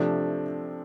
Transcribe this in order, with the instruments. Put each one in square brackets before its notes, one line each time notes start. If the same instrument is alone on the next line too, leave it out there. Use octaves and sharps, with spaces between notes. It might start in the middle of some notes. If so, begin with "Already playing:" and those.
Already playing: [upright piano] C3 F3 A3 D4